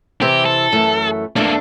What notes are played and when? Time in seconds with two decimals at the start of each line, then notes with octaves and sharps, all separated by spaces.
0.22 C3 E3 C4 G4
0.46 A4
0.72 F#2 E3 A3
1.36 E2 A3 A#3 D4 A4